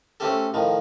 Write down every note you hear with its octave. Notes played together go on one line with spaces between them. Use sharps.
A3 C4 C#4 G4 A4
A2 D#3 F3